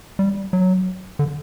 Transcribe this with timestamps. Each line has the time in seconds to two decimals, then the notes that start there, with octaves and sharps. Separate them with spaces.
0.19 G3
0.53 F#3
1.19 D3